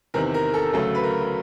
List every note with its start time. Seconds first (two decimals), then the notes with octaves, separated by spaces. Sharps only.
0.14 E2 C3 D#3 A#4
0.34 A#4
0.54 A4
0.73 D2 C#3 F#3 A3 A4
0.95 B4
1.04 A#4